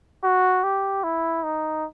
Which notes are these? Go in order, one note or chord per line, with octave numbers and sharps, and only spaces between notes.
F#4
G4
E4
D#4